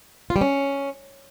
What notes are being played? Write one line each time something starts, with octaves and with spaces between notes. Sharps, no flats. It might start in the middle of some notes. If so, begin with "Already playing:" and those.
F4
G3
C#4